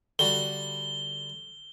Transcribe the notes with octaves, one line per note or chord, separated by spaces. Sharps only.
D3 G3 F#4 G7